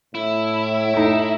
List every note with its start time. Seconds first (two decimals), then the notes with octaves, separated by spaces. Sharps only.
0.15 A2 E4
0.94 A3 D#4